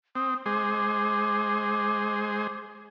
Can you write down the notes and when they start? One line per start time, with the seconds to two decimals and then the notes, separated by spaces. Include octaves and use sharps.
0.16 C4 D#6
0.46 G#3 G#4 C5 D6